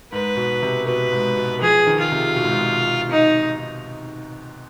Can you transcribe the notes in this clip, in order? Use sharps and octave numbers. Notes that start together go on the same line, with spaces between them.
G#2 B4
B2
C3
B2 B4
G#2
B2
F3 G#4
D#3
F4
C3
B2
G#2
B2
D#4